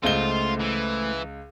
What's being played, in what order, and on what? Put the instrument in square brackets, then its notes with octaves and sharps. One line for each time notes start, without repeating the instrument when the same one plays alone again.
[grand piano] C#2 G7 [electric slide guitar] A3 C5 D#5 [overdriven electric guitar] F4
[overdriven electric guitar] E3